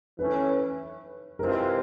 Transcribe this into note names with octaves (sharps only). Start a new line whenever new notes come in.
E3 A3 C#4 B4
C3 E3 G#3 C4 F4 A#4